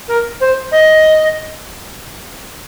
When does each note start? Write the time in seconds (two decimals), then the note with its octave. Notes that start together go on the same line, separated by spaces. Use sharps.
0.08 A#4
0.41 C5
0.72 D#5